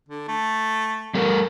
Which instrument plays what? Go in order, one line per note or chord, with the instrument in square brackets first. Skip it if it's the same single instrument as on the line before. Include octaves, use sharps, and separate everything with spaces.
[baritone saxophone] D3
A3
[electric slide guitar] G3 A4 A#4